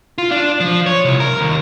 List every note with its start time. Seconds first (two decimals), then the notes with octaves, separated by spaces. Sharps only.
0.18 F4
0.31 D4
0.60 F3
0.86 C#5
1.05 C2
1.20 A#4
1.41 D#2